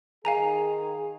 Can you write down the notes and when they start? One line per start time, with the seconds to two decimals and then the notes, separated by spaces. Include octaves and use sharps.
0.25 D#3 G#4 F5 G#5 A#5